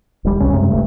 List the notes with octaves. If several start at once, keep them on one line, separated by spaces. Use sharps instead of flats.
D#1 G3
C2 C3 C#4
F#2 C3 G#3
D1 G2 A3